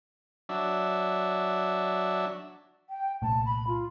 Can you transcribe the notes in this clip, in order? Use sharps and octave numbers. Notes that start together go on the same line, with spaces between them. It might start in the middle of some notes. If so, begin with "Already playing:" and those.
F#3 D4 E5
G5
C2 A#2 A3 A5
B5
F4